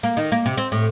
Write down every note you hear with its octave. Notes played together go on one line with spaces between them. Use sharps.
A#3
D#3
A#3
C3
C4
A2